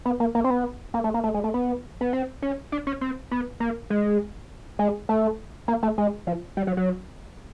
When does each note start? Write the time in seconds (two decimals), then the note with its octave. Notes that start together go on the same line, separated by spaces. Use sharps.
0.06 B3
0.20 A#3
0.35 A#3
0.44 C4
0.50 B3
0.94 A#3
1.04 A3
1.14 A#3
1.24 A3
1.34 G#3
1.44 A3
1.54 B3
2.01 B3
2.13 C4
2.42 C#4
2.72 D4
2.87 C#4
3.01 C4
3.31 B3
3.60 A#3
3.90 G#3
4.79 G#3
5.09 A3
5.68 A#3
5.83 A3
5.98 G#3
6.27 F3
6.57 G3
6.67 F#3
6.77 F#3